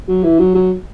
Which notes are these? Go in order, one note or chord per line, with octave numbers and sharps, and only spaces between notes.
F#3
E3
F#3
F#3